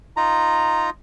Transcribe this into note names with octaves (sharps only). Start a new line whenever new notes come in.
D#4 F4 A#5